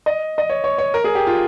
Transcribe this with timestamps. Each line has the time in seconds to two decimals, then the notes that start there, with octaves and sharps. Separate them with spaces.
0.06 D#5
0.38 D#5
0.50 C#5
0.64 C#5
0.78 C#5
0.94 A#4
1.04 G#4
1.15 G4
1.27 F4